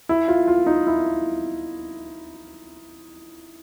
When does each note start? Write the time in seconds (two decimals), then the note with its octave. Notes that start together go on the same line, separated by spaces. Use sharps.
0.09 E4
0.28 F4
0.48 F4
0.66 D#4
0.87 E4